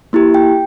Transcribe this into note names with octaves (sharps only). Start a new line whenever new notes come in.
A#3 E4 G4
G5